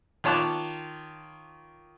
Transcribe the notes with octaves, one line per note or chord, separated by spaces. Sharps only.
D#3 F4 C#5 A5 D6 F#6